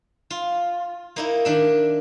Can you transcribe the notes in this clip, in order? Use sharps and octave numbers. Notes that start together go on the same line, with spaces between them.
F4
A#3 D#4 E4
D#3 D4 E5